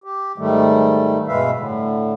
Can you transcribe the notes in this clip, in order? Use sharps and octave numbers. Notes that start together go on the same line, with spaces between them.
G4
G#2 D#3 G3 A3
G2 B2 G#3 B4 E5 F5
A2 D3